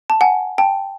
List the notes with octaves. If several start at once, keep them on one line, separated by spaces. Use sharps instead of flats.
A5
F#5 G#5
G5 A5